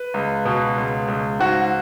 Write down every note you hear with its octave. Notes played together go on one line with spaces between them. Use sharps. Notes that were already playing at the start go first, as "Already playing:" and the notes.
Already playing: B4
C#2
B2
C#2
C#2
G#2 F#4